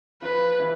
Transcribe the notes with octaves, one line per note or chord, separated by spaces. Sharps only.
F3 F4 B4
E3 E4